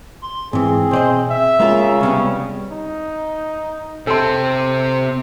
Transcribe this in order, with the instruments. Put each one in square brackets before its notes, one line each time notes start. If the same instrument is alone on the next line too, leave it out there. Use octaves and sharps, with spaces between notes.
[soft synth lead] C6
[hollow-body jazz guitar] G#2 E3 [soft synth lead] C4 [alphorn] G#4
[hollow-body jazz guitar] B2 D5 D#5 [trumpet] C5
[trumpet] E5
[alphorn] C#3 [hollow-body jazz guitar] G#3 A#3 F4 [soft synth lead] A#5
[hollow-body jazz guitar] C#2 C3 B3 [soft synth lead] G3 [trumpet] C#4
[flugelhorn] D#4
[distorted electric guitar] C3 C4 [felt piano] A4 C6 [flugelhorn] C5